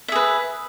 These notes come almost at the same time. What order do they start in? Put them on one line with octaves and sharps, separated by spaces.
E5 G#4 B4